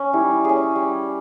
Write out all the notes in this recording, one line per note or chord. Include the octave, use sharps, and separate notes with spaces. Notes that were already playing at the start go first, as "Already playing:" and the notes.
Already playing: C#4
G3 E4
C#4 G#4
G3